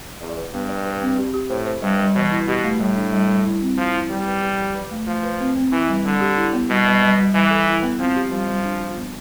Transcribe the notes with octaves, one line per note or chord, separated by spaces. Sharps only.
E2 D5
B4
G2 B3
D5
B4
C4
G4
G4
A2 C5
C5
G2 G3
G3
B2 E3
E4
B2 G4
A3
A2 G3
D4
G3
G3
E4
C4
F3 E4
E4
G3 B4
B4
G4
F3
B4
A3
F3 A3
B4
C4
C4
E3 E4
G3
D3 G3
G4
E4
B3
B2 G3
G3
G3
G3
E3 G3
A4
E4
B3
F3 C4
G4
F3 G3
G3
D4
F4
B3